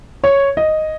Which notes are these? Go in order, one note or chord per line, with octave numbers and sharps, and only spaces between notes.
C#5
D#5